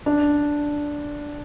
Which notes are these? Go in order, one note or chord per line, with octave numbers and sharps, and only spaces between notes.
D4